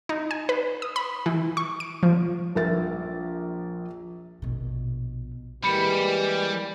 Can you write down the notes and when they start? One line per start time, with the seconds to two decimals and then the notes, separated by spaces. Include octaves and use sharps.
0.09 D#4
0.31 G#5
0.49 B4
0.82 D#6
0.96 B5
1.26 E3
1.57 C#6
1.80 D7
2.03 F3
2.55 A#1 A#4 E5 A6
4.42 A#1 B2
5.64 E3 G3 G#3 A#3 G4 B5 C#7